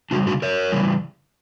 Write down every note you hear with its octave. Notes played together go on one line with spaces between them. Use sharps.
C#3 G3 D4 F#4
D4 F#4
A#4 C#5
C#3 E3 G3